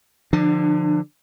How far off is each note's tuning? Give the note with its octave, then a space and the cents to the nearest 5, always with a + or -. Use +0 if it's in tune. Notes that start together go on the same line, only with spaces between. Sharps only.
D3 +15 F3 +0 D4 +40